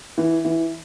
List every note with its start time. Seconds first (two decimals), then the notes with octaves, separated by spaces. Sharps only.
0.18 E3
0.45 E3